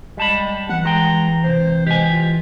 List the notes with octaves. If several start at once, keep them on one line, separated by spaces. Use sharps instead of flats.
G3 G#3 A5 B5
E3 F#5
G#3 G5 A#5
D#2 C3 C5
G#3 G4 G#5
F4